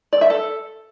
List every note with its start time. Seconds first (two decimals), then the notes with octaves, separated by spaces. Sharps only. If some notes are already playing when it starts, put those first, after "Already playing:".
0.13 D5
0.21 E5
0.30 A4